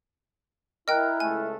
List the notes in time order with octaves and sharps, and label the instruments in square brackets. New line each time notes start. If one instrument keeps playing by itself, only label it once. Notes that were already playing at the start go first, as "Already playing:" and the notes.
[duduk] E4 [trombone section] A#4 [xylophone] D#5 G5 [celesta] F6 F#6
[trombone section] C#2 A3 [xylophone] G#5